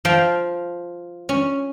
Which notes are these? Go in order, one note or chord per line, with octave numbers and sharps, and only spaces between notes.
F3 F5 G5
C#4